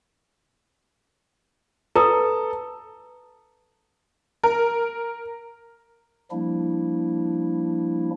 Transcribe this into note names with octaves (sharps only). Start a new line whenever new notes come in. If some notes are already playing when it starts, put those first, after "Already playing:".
A4 B4 A#5 D#6
A#4
F3 G3 A#3 D4 E4